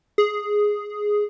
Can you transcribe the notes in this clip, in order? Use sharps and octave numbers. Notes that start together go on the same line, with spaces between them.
G#4